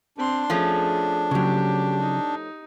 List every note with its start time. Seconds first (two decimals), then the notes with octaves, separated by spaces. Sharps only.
0.18 C4 D4 C6
0.50 F3 A3 C#4 G#4
1.31 C#3 F#3 G4
2.01 D#4